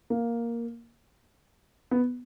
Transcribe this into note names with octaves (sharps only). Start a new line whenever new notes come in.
A#3
B3